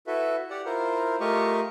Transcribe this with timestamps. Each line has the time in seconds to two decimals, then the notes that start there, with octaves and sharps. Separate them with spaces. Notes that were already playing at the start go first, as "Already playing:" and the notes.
0.07 E4 F#4 A4 B4 E5
0.50 G4 D5 F#5
0.65 E4 F4 A#4 C5
1.20 A3 F4 G4 A#4 D#5 C#6